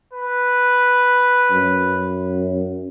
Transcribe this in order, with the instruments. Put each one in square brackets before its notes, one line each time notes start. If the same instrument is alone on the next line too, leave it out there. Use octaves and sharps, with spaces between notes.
[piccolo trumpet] B4
[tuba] F#2